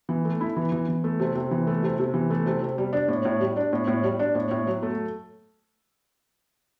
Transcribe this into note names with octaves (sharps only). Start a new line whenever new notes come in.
E3
A3
E4
E3
E3
E3
A3
C3
C3
E3
A3
C3
C3
E3
A3
C3
C3
G3
D4
A2
A2
G3
D4
A2
A2
G3
D4
A2
A2
F#3
A3